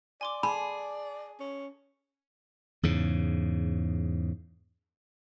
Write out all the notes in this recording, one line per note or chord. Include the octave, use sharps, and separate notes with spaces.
D5 G#5 C6 D6
G#4 A5 B5
C#4
E2 G#2 C#3